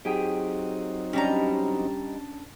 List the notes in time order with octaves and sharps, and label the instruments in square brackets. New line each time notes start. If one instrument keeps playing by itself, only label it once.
[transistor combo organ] F#3 C4 D#4 [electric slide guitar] G4 G#4 G5
[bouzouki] G3 D#5 A#5 [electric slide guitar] C#4 D4 C#5